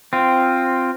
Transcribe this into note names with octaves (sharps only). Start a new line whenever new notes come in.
C4 F4